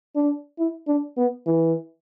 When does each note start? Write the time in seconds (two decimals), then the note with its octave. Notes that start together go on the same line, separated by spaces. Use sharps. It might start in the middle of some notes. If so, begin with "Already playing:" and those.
0.16 D4
0.59 E4
0.88 D4
1.17 B3
1.47 E3